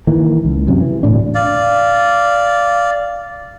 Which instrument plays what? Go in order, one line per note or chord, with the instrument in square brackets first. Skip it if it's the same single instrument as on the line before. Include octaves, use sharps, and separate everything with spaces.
[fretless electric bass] D#3 E3 A#3
C#2
F#2 C3
E3
E1 D2 A2 D4
[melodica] D5 F5